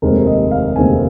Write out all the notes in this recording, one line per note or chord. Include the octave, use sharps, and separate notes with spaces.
F1 D#2 D#3 G#3 C4 A#4
D#5
F5
F1 D#2 D#3 G#3 C4 G#5